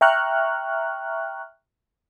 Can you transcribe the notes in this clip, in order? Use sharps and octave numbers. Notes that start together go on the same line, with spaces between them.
E5 G5 A#5 C#6 F6 F#6